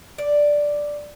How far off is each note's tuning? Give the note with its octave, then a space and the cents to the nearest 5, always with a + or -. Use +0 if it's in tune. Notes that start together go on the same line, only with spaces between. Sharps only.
D5 +0